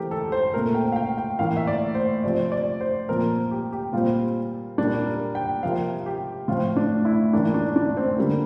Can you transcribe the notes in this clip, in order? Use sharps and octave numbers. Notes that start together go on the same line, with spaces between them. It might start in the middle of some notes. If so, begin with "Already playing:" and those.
Already playing: E3 A3 C4 G4 A#4
A4
C5
A#2 A3 C4 A#4
G5
F5
G5
G5
A2 E3 A#3 F5
E5
D5
C5
C3 F3 C4 D5
D5
C5
A#2 F3 C4 A#4
G4
G4
A#2 G3 C4 F4
A#2 G3 A#3 D4
A#4
G5
C3 F3 A#3 F5
G4
A2 F3 C4 F4
D4
E4
A2 E3 A#3 D4
D4
D4
C4
D3 G3 A#3